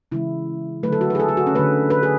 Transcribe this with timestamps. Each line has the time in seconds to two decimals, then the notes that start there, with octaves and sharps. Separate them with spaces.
0.12 C#3 E3 G#3 E4
0.83 D3 F#3 A3 B4
0.92 A4
1.01 F#4
1.10 B4
1.15 G#4
1.20 A4
1.28 G#4
1.37 F#4
1.47 C#4
1.55 D3 A3 B4
1.90 B4
2.03 G#4